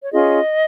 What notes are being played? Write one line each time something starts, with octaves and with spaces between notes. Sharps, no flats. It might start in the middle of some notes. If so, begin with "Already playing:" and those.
C#5
C#4 F4 G#4 D#5